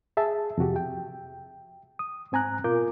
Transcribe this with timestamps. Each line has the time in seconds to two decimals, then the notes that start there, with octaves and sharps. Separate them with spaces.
0.17 G#4 E5 A5
0.58 F2 C3 F#4 G4
0.76 G5
1.99 D#6
2.32 G#2 C4 G#5 A#5 F#6
2.64 B2 F4 A#4 D6 G6